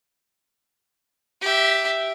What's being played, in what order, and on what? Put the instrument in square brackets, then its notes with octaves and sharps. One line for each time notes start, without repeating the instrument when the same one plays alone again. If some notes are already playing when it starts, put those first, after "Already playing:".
[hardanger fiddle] G4 E5